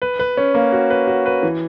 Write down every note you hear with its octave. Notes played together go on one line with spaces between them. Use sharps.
B4
B4
C#4
A#3
F#4
B4
F#4
B4
E3